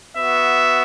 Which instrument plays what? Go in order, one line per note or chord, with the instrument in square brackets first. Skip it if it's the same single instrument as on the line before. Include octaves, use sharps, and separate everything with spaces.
[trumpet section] B3 F#4 E5